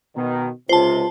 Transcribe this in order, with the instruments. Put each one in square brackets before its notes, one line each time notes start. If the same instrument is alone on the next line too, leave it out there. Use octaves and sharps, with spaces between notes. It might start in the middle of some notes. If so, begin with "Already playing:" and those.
[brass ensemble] B2 D#3
[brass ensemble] C#2 C3 [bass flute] F4 [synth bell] C5 A5